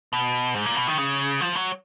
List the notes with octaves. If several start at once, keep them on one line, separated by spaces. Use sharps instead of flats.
B2
G#2
A#2
B2
D#3
C#3
F3
F#3